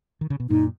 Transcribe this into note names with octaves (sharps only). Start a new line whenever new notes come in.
D#3
C#3
B2
F#2 A#2 D#4